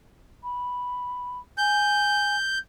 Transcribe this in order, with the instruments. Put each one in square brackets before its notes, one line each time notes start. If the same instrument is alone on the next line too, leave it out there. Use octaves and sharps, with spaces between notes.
[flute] B5
[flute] G#5 [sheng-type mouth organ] G6